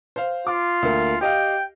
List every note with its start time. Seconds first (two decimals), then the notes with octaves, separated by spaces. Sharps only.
0.16 C5 F5
0.47 F4 D6
0.82 D2 A#3
1.21 G4 D#5 F5 G5